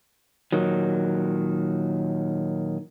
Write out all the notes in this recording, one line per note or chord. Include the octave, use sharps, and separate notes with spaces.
A#2 D#3 F#3